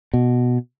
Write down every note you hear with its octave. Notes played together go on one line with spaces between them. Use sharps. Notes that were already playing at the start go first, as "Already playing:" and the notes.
B2